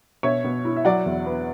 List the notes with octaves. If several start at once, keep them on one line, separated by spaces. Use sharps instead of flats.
B2 C#5 E5
B2
E4
E5
F#3 D5 F#5
E2
B3